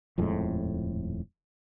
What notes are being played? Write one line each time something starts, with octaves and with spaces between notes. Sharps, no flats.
D#1 F2 A2 G#3